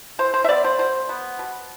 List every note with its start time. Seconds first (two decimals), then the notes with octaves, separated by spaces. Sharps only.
0.19 E3 C5
0.34 C5
0.44 E5
0.49 B3 D5
0.64 C5
0.79 B2 C5
1.09 B3
1.39 B2